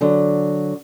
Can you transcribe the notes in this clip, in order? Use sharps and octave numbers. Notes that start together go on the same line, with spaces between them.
D3 F#3